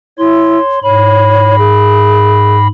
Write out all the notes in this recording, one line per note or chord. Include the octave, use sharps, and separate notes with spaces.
E4 C#5 C6
G#2 C#5 B5
G#4